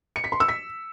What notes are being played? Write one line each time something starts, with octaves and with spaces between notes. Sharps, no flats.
C#7
B6
C6
E6
B6